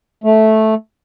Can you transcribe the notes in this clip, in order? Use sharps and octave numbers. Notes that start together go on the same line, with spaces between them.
A3